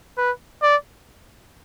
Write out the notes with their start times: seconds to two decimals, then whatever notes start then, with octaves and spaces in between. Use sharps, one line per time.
0.18 B4
0.62 D5